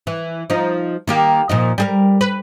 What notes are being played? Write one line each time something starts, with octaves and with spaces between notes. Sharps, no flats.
E3
F3 D#4
D#3 A#3 G4
A#2 F3 D#4
G3 G#4 A#4
B4